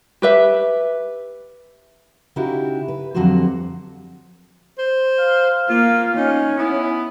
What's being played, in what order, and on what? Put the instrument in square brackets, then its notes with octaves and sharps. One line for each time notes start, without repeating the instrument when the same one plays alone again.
[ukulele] G4 B4 E5
[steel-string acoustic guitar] C#3 D#4 E4 F#4 G4
B4
F2 D3 F#3 G3 F#4 C5
[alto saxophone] C5
[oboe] F5
[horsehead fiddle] A#3 [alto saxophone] F4
[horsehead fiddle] C#4 [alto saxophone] D#4
[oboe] B3 [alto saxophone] E4